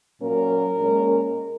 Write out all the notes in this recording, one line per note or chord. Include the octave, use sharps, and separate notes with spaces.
A#2 F#3 A#3 C#4 A#4
A#2 G#3 C#4